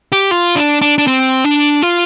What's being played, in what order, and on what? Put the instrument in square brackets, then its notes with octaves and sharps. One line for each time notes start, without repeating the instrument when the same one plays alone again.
[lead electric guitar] G4
F4
D4
D4
D4
C4
D4
F4